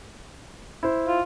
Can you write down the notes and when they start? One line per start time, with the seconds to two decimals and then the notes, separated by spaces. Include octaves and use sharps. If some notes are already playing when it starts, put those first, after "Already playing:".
0.83 E4 C5
1.08 F4